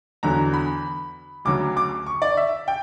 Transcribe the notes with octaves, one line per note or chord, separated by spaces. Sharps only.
E2 D3 F#3 A#5
B5
D2 C#3 F#3 D6
D6
C#6
D5
E5
G5